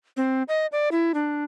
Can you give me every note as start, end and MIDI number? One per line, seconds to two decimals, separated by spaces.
0.17 0.43 60
0.48 0.66 75
0.72 0.89 74
0.92 1.12 64
1.14 1.44 62